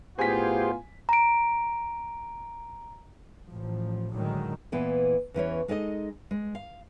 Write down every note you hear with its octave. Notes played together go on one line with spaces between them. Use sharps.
A2 B3 F4 G4 G#4 C5 G#5 B6
A#5 D7
A1 F3
A2 D3 D#3 F#3 G#3
A#2 E3 B3 E4
E2 E3 C#4 C#5
G#3 D#4 A4 D5 D#5
G#3
F5